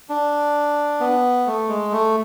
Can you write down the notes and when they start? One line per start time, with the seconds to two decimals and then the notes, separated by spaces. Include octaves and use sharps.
0.09 D4
1.00 B3
1.46 A3
1.69 G#3
1.92 A3